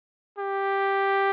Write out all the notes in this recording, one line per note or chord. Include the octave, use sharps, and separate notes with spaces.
G4